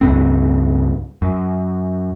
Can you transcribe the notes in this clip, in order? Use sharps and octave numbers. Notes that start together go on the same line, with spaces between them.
C#2 G2 C4
F#2